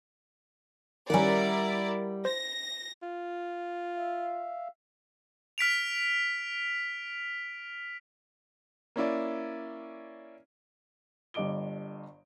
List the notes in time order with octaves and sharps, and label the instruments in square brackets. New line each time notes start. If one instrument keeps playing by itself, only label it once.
[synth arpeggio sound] D#3 C#4 [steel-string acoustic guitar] G3 F#5 [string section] E4 A#4 D5
[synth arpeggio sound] C5 [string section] A#6
[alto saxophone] F4
[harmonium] E5 F5
[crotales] F6 B6 D7 F7
[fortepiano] A#3 C#4 E4 D5
[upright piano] G1 G2 D#5 D6 D7 G7